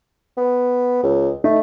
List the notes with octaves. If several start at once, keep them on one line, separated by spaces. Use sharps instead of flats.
B3
C#2
A3 D#4